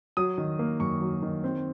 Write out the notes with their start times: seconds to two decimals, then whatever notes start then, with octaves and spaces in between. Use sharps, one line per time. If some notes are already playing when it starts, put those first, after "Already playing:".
0.17 F#3 D#6
0.38 D#3
0.59 A#3
0.80 F#2 C#6
1.01 F#3
1.22 D#3
1.44 C4